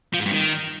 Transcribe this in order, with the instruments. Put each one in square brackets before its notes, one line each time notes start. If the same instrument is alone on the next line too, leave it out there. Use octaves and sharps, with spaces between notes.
[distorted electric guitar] F3
G#2
G2
D#3